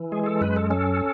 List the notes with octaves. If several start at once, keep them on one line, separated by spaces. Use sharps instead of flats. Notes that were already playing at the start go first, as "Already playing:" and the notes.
Already playing: E3
G#3 G#4
G#4
A4
F#2 B4
A4
C#4 A4